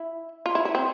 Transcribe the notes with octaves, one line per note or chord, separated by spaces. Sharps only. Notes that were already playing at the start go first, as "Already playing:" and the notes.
Already playing: E4
F4
E4
E4
C4